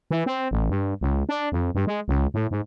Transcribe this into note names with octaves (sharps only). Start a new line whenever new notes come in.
E3
C4
A1
G2
C#2
D4
F2
G2
G#3
C#2
A2
G#2